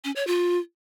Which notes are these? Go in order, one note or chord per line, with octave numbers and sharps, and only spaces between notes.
C#4
C#5
F4